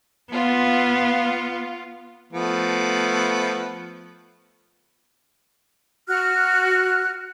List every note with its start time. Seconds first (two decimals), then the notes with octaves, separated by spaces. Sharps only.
0.33 B3 F4
2.33 F3 A3 B3
6.09 F#4 F6 F#6